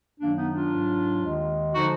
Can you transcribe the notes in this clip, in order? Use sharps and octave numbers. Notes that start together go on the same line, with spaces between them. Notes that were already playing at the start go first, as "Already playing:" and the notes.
F#2 D#3 F#3 A#3 D4
B3 D#4
D4 F4
G#2 F#3
D#2 D#3 G#3
D3 F3 G#3 D#4 F#4